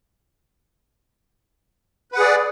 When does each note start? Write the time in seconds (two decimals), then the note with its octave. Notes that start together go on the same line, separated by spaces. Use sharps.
2.12 B4
2.15 F#5
2.17 G#4
2.20 D5